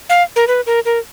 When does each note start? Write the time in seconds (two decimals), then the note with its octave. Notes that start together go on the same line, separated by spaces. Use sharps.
0.09 F5
0.36 A#4
0.48 B4
0.66 A#4
0.85 A#4